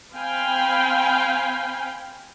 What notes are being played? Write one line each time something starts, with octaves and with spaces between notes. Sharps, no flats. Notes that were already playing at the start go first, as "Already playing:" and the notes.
C4 F5 G5 G#5 B5